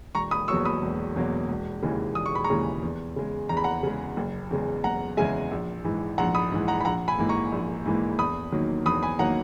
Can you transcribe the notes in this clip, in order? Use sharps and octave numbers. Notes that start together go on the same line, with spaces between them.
E1 A#5 C#6
B5 D#6
E2 B2 F#3 A#3 C#6 E6
B5 D#6
E1
E2 B2 F#3 A#3
E1
D#2 C#3 E3 G#3
E1 D#6
C#6
B5
A#5 C#6
D#2 C#3 E3 G#3
E2
C#3 G#3
E2 A#5
B5
F#5 A#5
C#3 G#3
F#1
E2 C#3 G#3
F#1 F#5 A#5
E2 C#3 G#3 E5 G#5
A#1
G#2 E3
A#1 F#5 A#5
B5 D#6
G#2 E3
F#5 A#5
B5
A#1 F#5 A#5
G#5 B5
G#2 E3 A#3
A#5 C#6
A#1
G#2 E3 A#3
E2 B5 D#6
D#3 F#3 A#3
E2 B5 D#6
G#5 B5
D#3 F#3 A#3 F#5 A#5